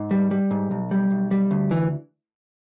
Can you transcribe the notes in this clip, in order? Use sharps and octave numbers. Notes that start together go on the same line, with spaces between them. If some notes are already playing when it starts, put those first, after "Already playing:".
Already playing: G#2
G3
G3
G#2
B1
G3
B1
G3
D2
E3